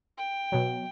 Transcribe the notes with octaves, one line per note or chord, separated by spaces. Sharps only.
G5
B2 F#3